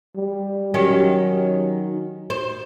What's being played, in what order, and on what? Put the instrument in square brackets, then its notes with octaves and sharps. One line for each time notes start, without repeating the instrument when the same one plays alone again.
[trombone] G3
[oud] D#3 C#4 G4 [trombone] F#3
[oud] C5